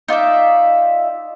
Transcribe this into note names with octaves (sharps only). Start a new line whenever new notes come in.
D#4 F4 D5 E5